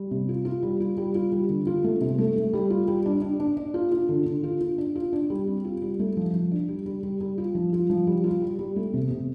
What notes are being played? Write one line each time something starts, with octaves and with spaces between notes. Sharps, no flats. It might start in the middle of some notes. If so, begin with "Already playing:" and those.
Already playing: G3
C3
F4
F4
G3
F4
G3
F4
G3
D3
F4
A3
C3
A3
A3
G3
F4
G3
D4
D4
D4
D4
F4
F4
D3
D3
F4
F4
D4
F4
D4
G3
C4
F4
G3
A3
F3
F3
D4
G3
G3
G3
G3
F4
F3
F4
F3
G3
F4
G3
G3
A3
C3
C3